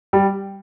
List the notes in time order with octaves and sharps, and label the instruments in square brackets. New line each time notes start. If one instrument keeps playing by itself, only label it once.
[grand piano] G3